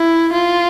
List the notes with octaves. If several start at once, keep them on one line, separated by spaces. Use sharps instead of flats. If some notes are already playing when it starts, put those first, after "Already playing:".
Already playing: E4
F4